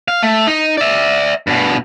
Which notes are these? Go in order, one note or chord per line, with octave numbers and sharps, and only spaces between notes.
F5
A3
D#4
D5 E5
G2 B2